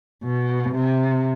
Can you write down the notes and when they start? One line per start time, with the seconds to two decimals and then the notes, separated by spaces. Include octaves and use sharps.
0.24 B2
0.75 C3